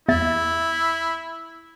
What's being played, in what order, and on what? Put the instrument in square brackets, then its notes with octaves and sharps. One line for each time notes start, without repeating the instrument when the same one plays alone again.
[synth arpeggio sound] E2 E5 A6 [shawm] E4